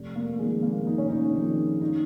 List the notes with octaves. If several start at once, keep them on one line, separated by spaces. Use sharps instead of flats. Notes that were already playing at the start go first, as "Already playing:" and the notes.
Already playing: F1
A#3
F2 D#3 G#3
A#3
F1 D#4
C#4
D#4
F2 D#3
D#4